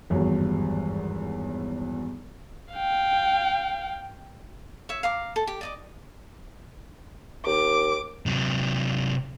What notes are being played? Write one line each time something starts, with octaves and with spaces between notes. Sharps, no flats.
G#1 E2 G2 F#3
F5 G5
C#5 E5
F5 A#5 D6
A4
G4
D5 D#5 D6
D#2 D6
C3 F#3